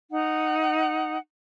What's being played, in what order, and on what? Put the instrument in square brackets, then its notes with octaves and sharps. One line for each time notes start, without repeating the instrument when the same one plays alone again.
[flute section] D#4 F#5